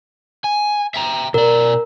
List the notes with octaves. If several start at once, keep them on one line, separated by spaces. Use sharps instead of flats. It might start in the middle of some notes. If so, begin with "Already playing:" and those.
G#5
E5 G5 A#5
B2 A#4 D5